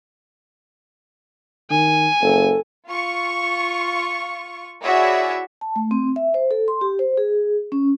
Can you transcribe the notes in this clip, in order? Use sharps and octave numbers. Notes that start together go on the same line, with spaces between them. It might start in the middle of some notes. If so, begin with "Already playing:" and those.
D#3 G#5
F#1 A4
F4 C#6
E4 F#4 G#4 C#5 D5 E5
A5
A3
C4
E5
C5
A4
C6
G4
C5
G#4
C#4